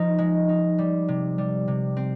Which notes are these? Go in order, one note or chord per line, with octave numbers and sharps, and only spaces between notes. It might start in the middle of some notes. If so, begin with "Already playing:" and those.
Already playing: F3 D#4
G#3
D#4
G3
C3
G3
C3
C4